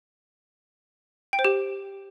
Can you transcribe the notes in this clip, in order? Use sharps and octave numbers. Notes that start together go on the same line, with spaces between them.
G5
C5
G4